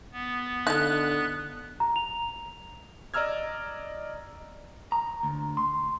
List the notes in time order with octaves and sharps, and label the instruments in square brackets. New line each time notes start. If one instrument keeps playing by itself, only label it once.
[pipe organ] B3
[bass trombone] D3 [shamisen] D#4 E4 A4 [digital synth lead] F#6
[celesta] A#5
F7
[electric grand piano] D5 D#5 A#5 E6 F6 G#6
[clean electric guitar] A#5
D2
C6